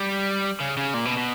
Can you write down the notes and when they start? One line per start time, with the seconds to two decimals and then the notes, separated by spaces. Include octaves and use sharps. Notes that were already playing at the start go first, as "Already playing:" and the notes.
Already playing: G3
0.60 C#3
0.77 C#3
0.94 A#2
1.05 B2
1.17 B2